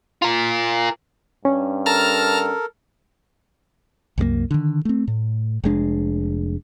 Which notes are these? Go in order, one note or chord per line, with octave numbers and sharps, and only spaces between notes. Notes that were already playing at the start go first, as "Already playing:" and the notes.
F4 A#4
G2 C#4
A4 A#4 A5 A#5 F6
C2 F#2 G#3 A#3
D3 D#3
A3 C4
A2
F1 G#3 D4